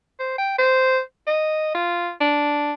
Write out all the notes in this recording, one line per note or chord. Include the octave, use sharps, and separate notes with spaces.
C5
G5
C5
D#5
F4
D4